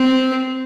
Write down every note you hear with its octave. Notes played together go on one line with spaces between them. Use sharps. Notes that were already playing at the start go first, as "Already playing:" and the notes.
Already playing: C4